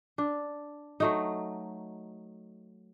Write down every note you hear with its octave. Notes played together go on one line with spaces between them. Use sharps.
D4
F#3 A3 D#4